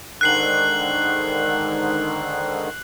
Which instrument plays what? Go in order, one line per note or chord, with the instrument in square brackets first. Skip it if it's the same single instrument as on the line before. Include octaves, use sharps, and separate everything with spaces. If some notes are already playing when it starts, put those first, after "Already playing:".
[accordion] G#2 D3 D#3 [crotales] F#6 C7 F#7